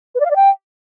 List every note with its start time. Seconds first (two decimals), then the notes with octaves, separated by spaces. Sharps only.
0.15 B4
0.20 D5
0.25 F5
0.31 D5
0.36 G5